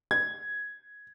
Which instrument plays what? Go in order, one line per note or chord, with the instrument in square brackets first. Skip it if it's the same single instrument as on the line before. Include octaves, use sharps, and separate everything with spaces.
[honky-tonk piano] G#6